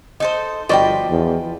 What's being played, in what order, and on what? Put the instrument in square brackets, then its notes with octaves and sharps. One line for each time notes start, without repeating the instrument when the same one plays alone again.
[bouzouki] D#4 A4 C5
[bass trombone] G1 [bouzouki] F3 B4 G5 [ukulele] F#4 D5 D#5
[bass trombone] E2